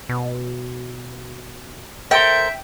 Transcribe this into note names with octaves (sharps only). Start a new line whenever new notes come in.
B2
A4 A#4 C5 E5 G5